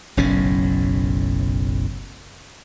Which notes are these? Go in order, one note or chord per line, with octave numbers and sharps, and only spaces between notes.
F#1 B1 A2 C#4